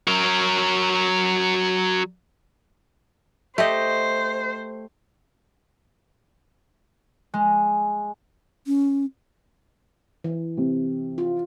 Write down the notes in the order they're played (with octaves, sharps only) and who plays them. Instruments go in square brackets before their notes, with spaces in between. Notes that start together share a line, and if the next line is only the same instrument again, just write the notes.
[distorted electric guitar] F#3 A#4
[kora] A3 G4 D#5 [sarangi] C5
[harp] G#3
[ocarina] C#4
[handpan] E3
[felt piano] C3
[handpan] F4